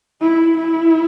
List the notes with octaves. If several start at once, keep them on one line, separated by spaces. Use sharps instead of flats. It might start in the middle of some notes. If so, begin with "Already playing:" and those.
E4
E4